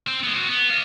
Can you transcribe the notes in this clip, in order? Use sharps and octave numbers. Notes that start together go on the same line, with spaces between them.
C4
G#3 B3
C4 F#4
B3
D#5 F5